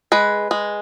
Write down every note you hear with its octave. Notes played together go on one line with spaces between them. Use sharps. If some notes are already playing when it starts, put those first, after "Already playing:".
G#3 B4
G#3